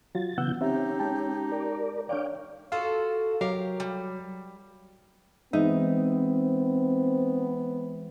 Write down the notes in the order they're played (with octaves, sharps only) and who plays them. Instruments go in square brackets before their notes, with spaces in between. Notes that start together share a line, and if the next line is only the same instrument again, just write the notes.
[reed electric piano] F#3 F4 F#4 [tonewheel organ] A6
[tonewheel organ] C#3 E3 G6 [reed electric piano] B3 F#5 E6
[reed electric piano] C4 E5 [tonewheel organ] C#4 [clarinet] D#4 [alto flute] G4
[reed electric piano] G#3 G5 A5
[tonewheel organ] A#4 D5
[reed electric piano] D4 C#5 D5 [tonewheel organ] F5 G5 D6
[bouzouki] F4 F#4 A4 [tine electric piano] F5
[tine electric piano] F#3 [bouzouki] G4 A#4 F5
[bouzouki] G3
[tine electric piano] E3 G#3 E5 [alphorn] B3 [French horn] C4 [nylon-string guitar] D#4